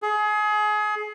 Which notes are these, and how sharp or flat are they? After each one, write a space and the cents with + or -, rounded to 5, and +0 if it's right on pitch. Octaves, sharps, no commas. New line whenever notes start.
G#4 +30